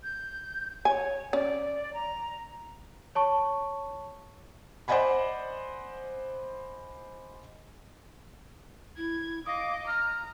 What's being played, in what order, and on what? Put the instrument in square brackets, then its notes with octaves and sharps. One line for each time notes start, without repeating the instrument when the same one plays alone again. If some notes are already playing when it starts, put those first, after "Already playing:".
[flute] G6
[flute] C#5 [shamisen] G#5
[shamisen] C#4 [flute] D5
[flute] A#5
[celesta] C#5 A5 C#6
[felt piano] C5 D5 D#5 F#5 G#5 B5
[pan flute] E4 [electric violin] G#6
[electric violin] D#5 D6 [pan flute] F5 [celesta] D#6 A#6
[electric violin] A#5 [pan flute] F6